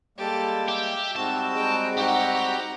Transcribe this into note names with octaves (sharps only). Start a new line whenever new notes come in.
G3 G#3 A#3 G4 A4
G4 E5
G#2 G3 C4 F#4 A5
G#3 G5 A#5
G#2 G4 F#5 A#5